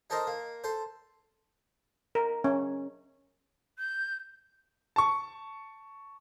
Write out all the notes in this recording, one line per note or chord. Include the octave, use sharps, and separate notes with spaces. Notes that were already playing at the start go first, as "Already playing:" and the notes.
D#4 A4 A#4 C5 D#5
A#3
A4 C5
A#4
C#4
G6
A5 C#6